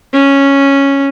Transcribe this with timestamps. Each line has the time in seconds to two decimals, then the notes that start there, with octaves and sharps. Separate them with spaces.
0.13 C#4